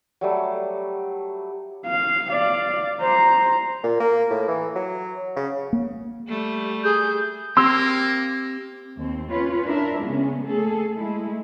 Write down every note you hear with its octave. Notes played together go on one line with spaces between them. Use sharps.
F#3 G3 A3
F5
D5 F5
C5 A#5
A#2
A#3
A2
E3
F#3
C#3
A#3
G3 A3
G#4 G6
A#3 C4 G4 C6 E6
D#2 C4
C#4 F4 B4 C#5
D4 E4 A#4 E5
C#3 G#3 B3 C#4
A3 A#3 G#4 A4
G#3 A3 E4